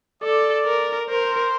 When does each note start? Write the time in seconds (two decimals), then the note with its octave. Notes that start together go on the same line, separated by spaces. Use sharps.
0.23 A4 D5
0.66 A#4
1.09 A#4 C5